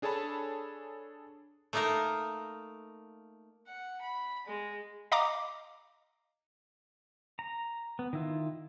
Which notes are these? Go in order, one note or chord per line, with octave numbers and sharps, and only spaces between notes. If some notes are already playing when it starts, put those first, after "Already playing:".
D4 G#4 A4 C#5 A5 B5
A3 A#3 D#4 F4 A#4
F#5
B5
G#3
D#5 F5 A#5 D6
A#5
B3
D#3 E4 F4